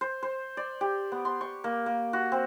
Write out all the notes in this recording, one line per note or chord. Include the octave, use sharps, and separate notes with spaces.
C5
C5
D5
G4
B3
C6
C#6
A#3
A#3
F#4
C4